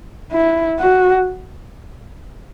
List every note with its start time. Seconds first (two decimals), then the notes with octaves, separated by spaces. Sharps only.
0.32 E4
0.80 F#4